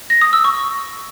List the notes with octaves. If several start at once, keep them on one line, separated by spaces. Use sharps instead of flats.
A#6
D#6
E6
C#6